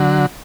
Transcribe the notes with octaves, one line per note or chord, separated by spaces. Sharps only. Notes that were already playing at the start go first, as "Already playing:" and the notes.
Already playing: D3 F#3